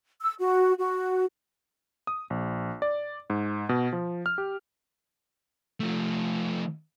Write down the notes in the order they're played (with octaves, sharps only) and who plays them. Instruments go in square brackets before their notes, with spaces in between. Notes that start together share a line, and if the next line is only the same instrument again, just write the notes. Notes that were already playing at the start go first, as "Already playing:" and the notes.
[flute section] E6
F#4
F#4
[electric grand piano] D#6
A#1
D5
G#2
B2
F3
F6
G4
[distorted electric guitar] F3 A3